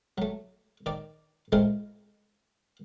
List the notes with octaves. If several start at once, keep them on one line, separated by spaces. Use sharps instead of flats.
F#3 A3
D#3 D5
G#3 A3 C4 E4 F4 A#4